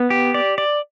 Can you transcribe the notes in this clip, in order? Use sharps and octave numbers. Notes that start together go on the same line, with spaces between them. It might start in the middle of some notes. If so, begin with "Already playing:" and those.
Already playing: B3
G4
D5
D5